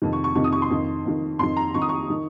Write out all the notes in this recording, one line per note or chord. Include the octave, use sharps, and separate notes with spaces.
F2 C3 D#3
C#6
C#6
F2 C3 D#3 C#6
D#6
C#6
C6
F2 D#3
F2 D#3
F2 D#3 C6
A#5
F2 D#3 C#6
D#6
C#6
D#3